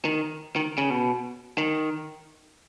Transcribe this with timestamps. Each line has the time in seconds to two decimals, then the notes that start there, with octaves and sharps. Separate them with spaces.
0.05 D#3
0.56 D#3
0.78 C#3
0.90 B2
1.58 D#3